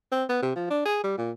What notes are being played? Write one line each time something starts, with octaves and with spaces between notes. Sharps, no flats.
C4
B3
C3
F3
D4
G#4
G3
A#2